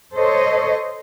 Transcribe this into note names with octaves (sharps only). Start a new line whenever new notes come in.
A4 C5 C#5 D#5